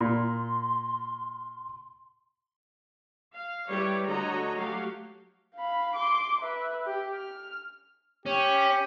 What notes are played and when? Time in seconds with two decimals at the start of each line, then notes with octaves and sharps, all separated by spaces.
0.01 A#2 C6
3.35 F5
3.69 G3 E4 B4 C#5
4.08 D3 A3 F#4 C#5 D#5 A#5
4.55 F#3 A3 G4 F5
5.55 F5 B5
5.96 C6 D6
6.41 B4 E5
6.86 G4
7.15 F6
8.26 C#4 G4